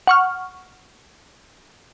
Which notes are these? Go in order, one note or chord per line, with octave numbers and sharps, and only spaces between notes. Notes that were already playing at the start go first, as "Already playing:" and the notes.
F#5 C#6 F6